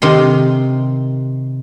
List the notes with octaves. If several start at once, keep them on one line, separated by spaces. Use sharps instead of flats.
C3 D#3 C6